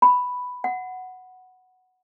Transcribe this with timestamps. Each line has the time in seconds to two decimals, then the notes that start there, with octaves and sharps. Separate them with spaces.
0.02 B5
0.64 F#5